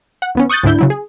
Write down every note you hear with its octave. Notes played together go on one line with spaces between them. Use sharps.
F#5
D#2 B3 C#4
C#6 D#6 F#6 G6 A6
D2 G#2 D3 D4 E4 G6
C#3 F#3 E4
G#4